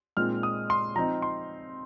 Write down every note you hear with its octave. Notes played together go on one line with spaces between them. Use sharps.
A#2 G#3 C4 D#4 F6
D#6
C6
F3 C4 D#4 A#5
C6